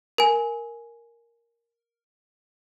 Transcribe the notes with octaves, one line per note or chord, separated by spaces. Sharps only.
A#4 G#5